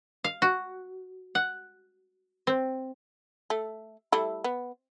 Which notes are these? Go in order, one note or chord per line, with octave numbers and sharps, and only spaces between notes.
F5
F#4
F#5
C4
A3
G3 A3 E4
B3